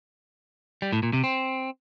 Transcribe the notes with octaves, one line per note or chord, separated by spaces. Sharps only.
G3
A2
A#2
C3
C4